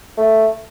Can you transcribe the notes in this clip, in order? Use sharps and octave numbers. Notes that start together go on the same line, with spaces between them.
A3